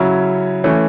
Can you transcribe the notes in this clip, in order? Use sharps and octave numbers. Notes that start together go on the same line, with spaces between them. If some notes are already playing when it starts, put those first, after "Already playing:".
Already playing: C#3 F#3 C#4 E4
E3 A3 C#4